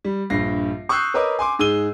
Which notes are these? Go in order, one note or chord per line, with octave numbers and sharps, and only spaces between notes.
G3
A#1 G2 A#6 C7
C#6 D#6 E6 F#6 G6 C7
A#4 B4 C#5 D#5 D6 D#6
G#5 C6 D6
G#2 G#4 E6 D#7 G7